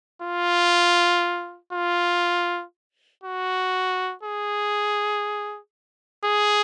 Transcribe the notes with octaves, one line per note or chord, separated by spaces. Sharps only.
F4
F4
F#4
G#4
G#4